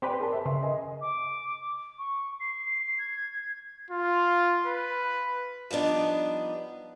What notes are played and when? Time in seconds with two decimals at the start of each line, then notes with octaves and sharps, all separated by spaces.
0.02 C4 G4 B4 D5 G#5 C6
0.20 G#4 A#4 A5
0.32 E5
0.46 C#3 E5 C6
0.62 D#5 G#5
1.01 D6
1.98 C#6
2.40 C7
2.65 C7
2.98 G#6
3.91 F4
4.67 B4
5.71 F3 G3 B3 D4 D#4